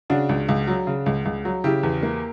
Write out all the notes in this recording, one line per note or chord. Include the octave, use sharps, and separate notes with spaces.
C#3 D4 F#4
C#2
C#2
F#3
C#3
C#2
C#2
F#3
C#3 E4 G4
E2
A#3